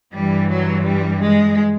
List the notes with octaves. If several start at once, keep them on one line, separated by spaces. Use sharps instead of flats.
G2 E3 G3
F#3
G3
G#3